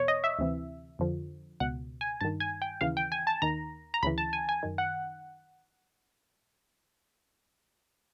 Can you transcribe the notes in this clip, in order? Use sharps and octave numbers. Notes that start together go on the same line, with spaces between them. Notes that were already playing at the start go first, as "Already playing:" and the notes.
Already playing: E2 B2 C#5
D#5
E5
D2 C3 E3
F2 D3 F3
C#2 B2 F#5
G#5
G2 D#3 A5
G#5
G5
D#2 C#3 E3 F5
G5
G#5
A5
D#2 D#3 A#5
A#5
D2 C#3 E3 B5
A5
G#5
G#5
F#2 D#3
F#5